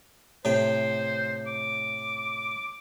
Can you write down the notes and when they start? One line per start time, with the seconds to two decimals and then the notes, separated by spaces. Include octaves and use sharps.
0.45 A2 C3 C5 G5
1.47 D6